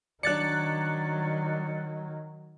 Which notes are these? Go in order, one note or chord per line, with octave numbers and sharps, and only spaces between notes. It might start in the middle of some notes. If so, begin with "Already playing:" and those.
D#3 F#3 D4 D5 F#6 A6 C#7